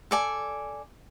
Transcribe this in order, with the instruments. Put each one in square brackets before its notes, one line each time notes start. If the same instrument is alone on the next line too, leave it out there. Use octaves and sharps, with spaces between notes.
[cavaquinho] A4 D5 G#5